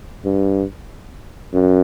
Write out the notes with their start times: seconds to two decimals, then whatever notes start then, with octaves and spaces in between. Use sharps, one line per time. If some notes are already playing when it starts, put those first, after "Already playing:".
0.24 G2
1.53 F#2